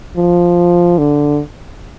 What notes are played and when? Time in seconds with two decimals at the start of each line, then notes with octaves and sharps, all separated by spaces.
0.17 F3
0.98 D3